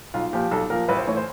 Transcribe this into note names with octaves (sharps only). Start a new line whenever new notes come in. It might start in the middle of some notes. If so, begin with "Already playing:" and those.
B1 F4
A#2 F3 G4
B1 A4
A#2 F3 A#4
A1 B4
C5
A2 E3 C#5
C5